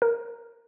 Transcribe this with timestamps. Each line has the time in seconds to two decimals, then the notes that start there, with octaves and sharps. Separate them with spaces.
0.02 A#4